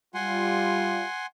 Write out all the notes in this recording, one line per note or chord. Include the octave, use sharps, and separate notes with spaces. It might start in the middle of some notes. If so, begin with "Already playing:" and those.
G3 F4 F#5 G#5 C6